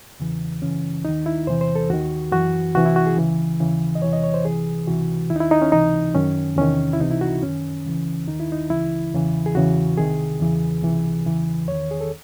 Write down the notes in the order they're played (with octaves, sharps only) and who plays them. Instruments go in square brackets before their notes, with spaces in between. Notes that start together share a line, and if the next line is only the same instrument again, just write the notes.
[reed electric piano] E2 C#3 E3
F#2 C#3 E3 C#4
D#2 D#3 D#4
E4
E2 C3 E3 C5
C5
A4
D#2 D#3 F#4
F#2 E3 F#4
C2 C3 E3 F#4
E4
F#4
G#4
C#2 C#3 E3
D#2 C#3 E3
D#5
E2 C3 E3 C#5
D#5
C#5
C5
C2 C3 E3 G#4
C#2 C3 E3 F#4
D#2 D#3 E4
D#4
E4
D#4
C#4
C#2 C3 E3 D#4
F#2 D#3 C#4
E2 C3 D#3 C#4
E4
C#2 C3 E3 D#4
E4
F#4
F#2 D#3 C#4
C#2 C#3 E3
D#2 D#3 D#4
E4
D#4
C#2 C#3 E3 E4
E2 C#3 E3
G#4
E2 C#3 E3 F#4
C2 C3 D#3 G#4
E2 C#3 E3
C#2 C3 E3
E2 C#3 E3
E2 D#3 C#5
G#4
A4